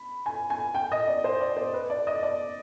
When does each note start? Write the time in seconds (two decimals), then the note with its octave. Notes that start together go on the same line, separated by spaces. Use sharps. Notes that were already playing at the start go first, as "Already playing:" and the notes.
Already playing: B5
0.26 G#5
0.50 G#5
0.75 G5
0.92 D#5
1.07 D5
1.24 C5
1.41 D5
1.57 C5
1.73 B4
1.90 D5
2.07 D#5
2.23 D5